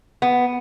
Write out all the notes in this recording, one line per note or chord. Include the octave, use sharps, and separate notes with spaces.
B3